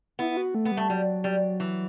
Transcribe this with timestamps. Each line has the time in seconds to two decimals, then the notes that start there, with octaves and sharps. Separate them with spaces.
0.19 B3 E4
0.30 E4
0.37 F#4
0.55 A3
0.65 B3
0.72 G3
0.77 A3
0.89 F#3 G3
1.24 G3
1.60 E3